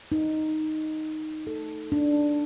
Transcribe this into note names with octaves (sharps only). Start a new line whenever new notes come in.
D#4
A4
D4